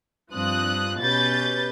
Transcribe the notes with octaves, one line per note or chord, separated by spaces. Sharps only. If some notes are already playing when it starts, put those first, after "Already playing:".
G2 F3 C4 D#6 F#6
B2 C#4 G4 B4 G6 A6